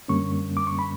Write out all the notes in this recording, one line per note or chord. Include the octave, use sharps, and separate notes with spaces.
F#2 D3 G3 A#3 C#4 C#6
D6
C#6
B5